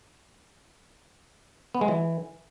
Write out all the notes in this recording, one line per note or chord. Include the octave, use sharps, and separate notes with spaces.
B3
G#3
E3